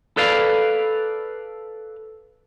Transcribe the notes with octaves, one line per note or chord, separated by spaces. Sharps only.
A4 B4 D5 F5